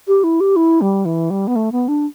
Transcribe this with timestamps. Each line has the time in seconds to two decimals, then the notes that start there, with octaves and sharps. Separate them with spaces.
0.08 G4
0.24 E4
0.40 G4
0.56 E4
0.81 G3
1.05 E3
1.30 G3
1.47 B3
1.56 A3
1.72 B3
1.88 D4